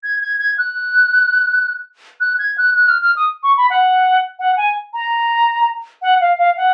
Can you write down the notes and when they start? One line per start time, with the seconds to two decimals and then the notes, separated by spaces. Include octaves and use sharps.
0.04 G#6
0.21 G#6
0.39 G#6
0.58 F#6
2.20 F#6
2.39 G#6
2.58 F#6
2.75 F#6
2.88 F6
3.02 F6
3.17 D#6
3.43 C#6
3.57 B5
3.70 F#5
4.39 F#5
4.57 G#5
4.94 A#5
6.02 F#5
6.21 F5
6.38 F5
6.57 F#5